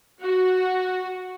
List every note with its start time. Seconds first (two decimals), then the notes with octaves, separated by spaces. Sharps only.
0.22 F#4